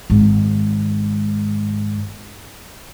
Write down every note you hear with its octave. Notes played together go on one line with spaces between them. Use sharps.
G#1 G#2